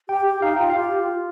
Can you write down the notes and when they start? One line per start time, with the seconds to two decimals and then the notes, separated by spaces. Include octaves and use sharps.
0.08 G4 G5
0.26 G4
0.42 D#4 F5
0.56 F4 G5
0.70 F5
0.76 G4
0.98 F4